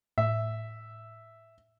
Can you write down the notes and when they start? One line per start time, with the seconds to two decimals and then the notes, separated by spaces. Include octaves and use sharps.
0.18 A2 E5